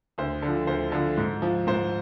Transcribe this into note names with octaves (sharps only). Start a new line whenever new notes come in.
D2 C5
D3
F3
D2 C5
D3 F3
G#2
F3
G#2 C5